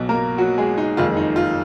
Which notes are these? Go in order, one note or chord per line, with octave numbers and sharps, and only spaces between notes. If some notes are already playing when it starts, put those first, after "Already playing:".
Already playing: B1 B2 F#3
A#3 A#4
F#3 F#4
G#3 G#4
D#4
F#1 F2 D#3 G#3 F4
D#4
F4